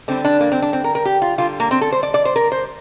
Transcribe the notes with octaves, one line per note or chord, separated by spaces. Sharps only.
D3 G3 C4
D4
A#3
C4
D4
C4
A#4
A#4
G4
F4
D3 G3 F4
A#3
C4
A4
C5
D5
D5
C5
A#4
C5